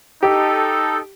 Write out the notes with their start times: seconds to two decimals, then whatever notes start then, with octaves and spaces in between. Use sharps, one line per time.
0.23 D#4 G4 A4